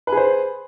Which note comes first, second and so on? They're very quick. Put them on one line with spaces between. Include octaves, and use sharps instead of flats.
B4 G#4 C5